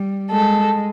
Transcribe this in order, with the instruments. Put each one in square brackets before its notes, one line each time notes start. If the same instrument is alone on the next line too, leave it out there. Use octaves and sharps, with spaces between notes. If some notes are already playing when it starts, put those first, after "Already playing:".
Already playing: [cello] G3
[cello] G#3 [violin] A4